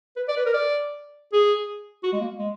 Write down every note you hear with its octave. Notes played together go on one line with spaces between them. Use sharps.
B4
D5
B4
A#4
D5
G#4
F#4
G#3
A#3
G#3